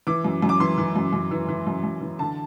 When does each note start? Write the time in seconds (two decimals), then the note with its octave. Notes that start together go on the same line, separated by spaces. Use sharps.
0.07 E3 D6
0.24 F#2
0.42 F#2
0.49 D6
0.60 E3 C6
0.78 E3
0.96 F#2
1.13 F#2
1.31 E3
1.48 E3
1.67 F#2
1.84 F#2
2.01 E3
2.19 D3 A5